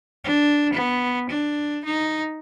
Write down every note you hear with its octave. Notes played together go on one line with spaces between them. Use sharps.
D4
B3
D4
D#4